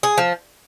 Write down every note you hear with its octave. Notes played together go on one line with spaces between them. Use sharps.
G#4
F3